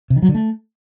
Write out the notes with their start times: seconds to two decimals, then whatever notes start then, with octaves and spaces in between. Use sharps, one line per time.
0.10 C3
0.16 D#3
0.22 F#3
0.29 D3
0.35 A3